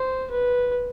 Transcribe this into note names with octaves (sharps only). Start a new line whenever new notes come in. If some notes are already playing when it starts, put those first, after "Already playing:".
Already playing: C5
B4